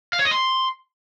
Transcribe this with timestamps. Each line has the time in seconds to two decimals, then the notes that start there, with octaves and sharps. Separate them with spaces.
0.13 F5
0.19 C#5
0.25 D#5
0.31 C6